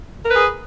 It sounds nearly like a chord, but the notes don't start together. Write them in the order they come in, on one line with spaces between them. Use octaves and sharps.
A#4 B4 G#4